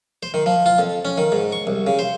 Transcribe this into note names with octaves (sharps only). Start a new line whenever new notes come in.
C5
D#3
F3
F4
F2
C#4
D#3
G#2
C#6
C2
C#3
C5